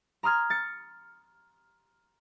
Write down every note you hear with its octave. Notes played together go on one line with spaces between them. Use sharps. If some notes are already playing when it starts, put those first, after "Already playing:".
A#5 C6 D#6 F6 G#6
A6 C#7